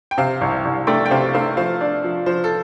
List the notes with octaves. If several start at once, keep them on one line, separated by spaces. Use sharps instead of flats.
G5
C3 C5 F5
C2
C2
A3 D5 G5
G5
C3 C5 F5
A3 C5 F5
F3 C5 F5
D4
F3
F3 C5
A4